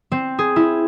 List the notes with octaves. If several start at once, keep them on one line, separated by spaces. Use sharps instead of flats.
C4
G#4
E4